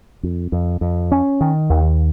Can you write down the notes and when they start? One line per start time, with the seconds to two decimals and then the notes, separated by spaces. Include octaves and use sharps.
0.23 F2
0.52 F2
0.81 F2
1.12 C#4
1.41 D#3
1.70 D#2